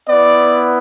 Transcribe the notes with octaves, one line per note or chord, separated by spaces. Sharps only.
B3 E4 D5